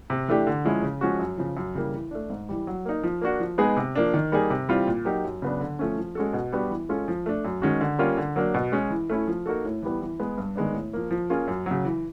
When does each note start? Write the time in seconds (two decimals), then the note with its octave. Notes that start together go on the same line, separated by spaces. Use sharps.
0.10 C3
0.28 E3 A3 D4 G4
0.47 D3
0.65 F3 G#3 C#4 E4
0.83 C#3
1.01 F3 G#3 C#4 F#4
1.20 F#2
1.38 C#3 F3
1.57 F#2
1.75 C#3 E3 G3 A#3
1.94 E3
2.11 A3 D4
2.30 G#2
2.49 E3 G3
2.67 F#3
2.85 A#3 D#4
3.03 F3
3.21 A#3 D4 F#4
3.40 F3
3.58 G#3 B3 D#4 G#4
3.77 C3
3.96 F3 A#3 D4
4.14 D#3
4.32 G3 A#3 D#4 G#4
4.50 C3
4.69 E3 G3 C4 F4
4.87 A#2
5.05 F#3 A#3 D#4 G4
5.24 F#2
5.42 C#3 F#3 B3 D4
5.60 D3
5.79 F3 A3 C#4
5.98 F3
6.15 G#3 C#4 F#4 A4
6.33 B2
6.52 G3 B3 D4 F#4
6.71 E3
6.89 G#3 C#4 F4 A4
7.08 F3
7.26 A3 D4
7.45 F#2
7.62 D#3 G#3 C#4 F#4
7.81 D3
7.98 G3 A#3 C#4 F4
8.17 D3
8.36 F#3 A#3 D4
8.54 B2
8.72 G#3 C#4
8.90 E3
9.10 A3 C#4 E4
9.27 F3
9.46 A#3 D#4 F#4 A4
9.65 A2
9.82 E3 G3 B3
10.01 E3
10.20 G#3 B3
10.38 G2
10.56 D#3 G#3 B3 D4
10.74 A2
10.93 F3 A#3
11.11 F3
11.30 A#3 C#4 F4 G#4
11.48 F#2
11.66 C#3 F#3
11.85 E3